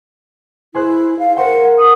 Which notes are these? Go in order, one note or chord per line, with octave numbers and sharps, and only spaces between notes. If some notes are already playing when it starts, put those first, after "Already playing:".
E4 G#4 C5 F#6
F5
A#4 C5 F#5 G5
D#6 D#7